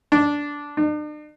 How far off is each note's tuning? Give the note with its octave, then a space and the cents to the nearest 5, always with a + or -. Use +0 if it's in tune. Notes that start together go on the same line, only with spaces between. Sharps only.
D4 -10
D4 +45